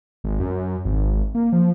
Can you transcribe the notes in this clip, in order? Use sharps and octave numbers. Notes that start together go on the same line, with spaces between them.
G#1
F#2
G#1
A#3
F3